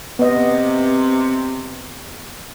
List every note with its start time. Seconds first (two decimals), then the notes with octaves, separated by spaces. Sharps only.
0.19 C3 B3 D#5